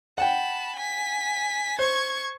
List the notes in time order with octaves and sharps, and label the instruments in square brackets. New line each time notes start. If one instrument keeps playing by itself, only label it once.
[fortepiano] F#5 G5 [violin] A5 B5
[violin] G#5 B6
[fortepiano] C5 [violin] C#6 G#6